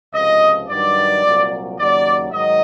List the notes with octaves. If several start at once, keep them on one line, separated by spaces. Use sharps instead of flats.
C#2 C3 F3 D#5
G2 D#3 F#3 D5
C2 A#2 F#3
D#2 C#3 F#3 D5
G#2 D#3 F#3 D#5